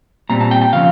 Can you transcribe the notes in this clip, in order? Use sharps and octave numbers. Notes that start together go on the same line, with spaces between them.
A#2 G3 C4 A#5
A5
G5
G5
C#3 F3 C4 F5